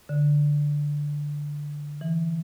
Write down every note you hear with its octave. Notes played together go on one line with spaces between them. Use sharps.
D3
E3